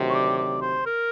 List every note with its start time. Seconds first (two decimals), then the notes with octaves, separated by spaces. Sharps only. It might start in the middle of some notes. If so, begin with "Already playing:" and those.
Already playing: D2 C3 D#3 F#3
0.10 C#5
0.15 D5
0.38 D5
0.61 C5
0.86 A#4